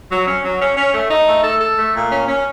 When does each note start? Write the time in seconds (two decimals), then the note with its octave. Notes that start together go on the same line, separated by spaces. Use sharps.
0.11 F#3
0.27 C#4
0.45 F#3
0.60 C#4
0.77 C#4
0.94 A3
1.10 D#4
1.27 A3
1.44 A4
1.61 A4
1.78 A3
1.94 A#2
2.11 C#4
2.28 C#4